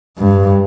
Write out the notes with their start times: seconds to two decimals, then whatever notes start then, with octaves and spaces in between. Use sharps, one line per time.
0.18 G2